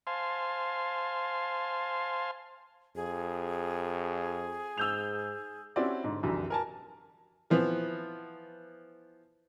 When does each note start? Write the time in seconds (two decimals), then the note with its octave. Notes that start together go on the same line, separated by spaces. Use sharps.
0.07 C5 F5 G#5 A5 C6
2.95 F2 G#4
4.77 G#2 E6 G6 F7
5.76 C4 C#4 E4 F#4 G4 D5
6.04 G#2 D3
6.23 F1 C2 F#2 D3 E3
6.50 A#4 G#5 A5
7.50 E3 F3 B3